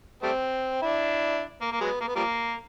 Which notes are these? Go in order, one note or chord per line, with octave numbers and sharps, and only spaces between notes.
G3 A3 C4
D4 E4
A#3
A#3
F#3 G#3 B3
A#3
B3
F3 G3 A#3